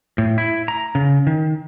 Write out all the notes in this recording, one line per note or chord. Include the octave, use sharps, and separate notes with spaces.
A2
E4
A#5
C#3
D#3